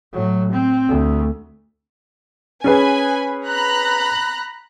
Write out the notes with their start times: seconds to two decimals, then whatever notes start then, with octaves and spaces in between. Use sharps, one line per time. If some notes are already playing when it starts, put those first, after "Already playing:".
0.13 A2 F#3
0.52 C4
0.89 D2
2.64 C#4 G#4 B4 G#5 B5
3.46 A#5 B5 F#6